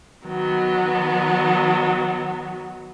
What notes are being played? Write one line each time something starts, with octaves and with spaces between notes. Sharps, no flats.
D#3 F#3 B3